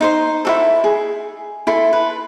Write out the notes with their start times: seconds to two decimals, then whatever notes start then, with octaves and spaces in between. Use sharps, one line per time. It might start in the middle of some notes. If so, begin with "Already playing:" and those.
0.01 D#4 C5 C6
0.45 E4 F#4 A4
0.84 G#4
1.67 E4 A4 C6
1.93 B4